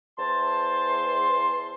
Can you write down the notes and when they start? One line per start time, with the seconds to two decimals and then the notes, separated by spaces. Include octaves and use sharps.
0.18 E2 C5 A5 C6